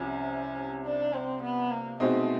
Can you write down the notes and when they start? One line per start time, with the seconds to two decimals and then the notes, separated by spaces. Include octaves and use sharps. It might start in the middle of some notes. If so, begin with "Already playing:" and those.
Already playing: C2 C3 F3 C#4
0.84 D4
1.13 C4
1.42 B3
1.71 A#3
2.00 B2 G#3 A3 C4 D#4